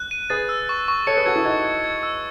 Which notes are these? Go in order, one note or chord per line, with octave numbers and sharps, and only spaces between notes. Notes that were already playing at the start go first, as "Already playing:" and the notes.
Already playing: F#6
D#7
G#4 B4 A6
E6
C#6
C#6
A4 C#5 C#7
G#4 B4
F#4 A4 G#6
E4 G#4
D#4 F#4 G#6
G#6
G#6
E6